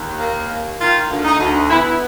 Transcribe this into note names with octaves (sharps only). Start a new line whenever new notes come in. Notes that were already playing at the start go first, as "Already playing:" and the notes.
Already playing: D#2
A#3
A#3
D#3 F4
D2
D#4
D2
B3 E4